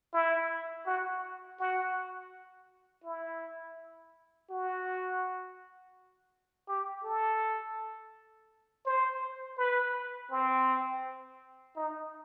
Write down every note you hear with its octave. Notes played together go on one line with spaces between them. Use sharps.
E4
F#4
F#4
E4
F#4
G4
A4
C5
B4
C4
D#4